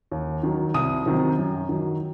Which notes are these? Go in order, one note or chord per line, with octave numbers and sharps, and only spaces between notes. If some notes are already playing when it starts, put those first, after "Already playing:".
D#2
D#3 F#3
C2 D#6
C3 D#3 F#3
F#2
D#3 F#3